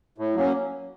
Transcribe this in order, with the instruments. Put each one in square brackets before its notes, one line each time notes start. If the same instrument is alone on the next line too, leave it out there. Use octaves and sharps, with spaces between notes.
[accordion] A2
F#3 A#3 C#4